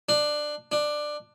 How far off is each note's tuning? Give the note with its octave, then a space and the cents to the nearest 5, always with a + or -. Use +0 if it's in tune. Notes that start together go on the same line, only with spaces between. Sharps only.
D4 +15
D4 +15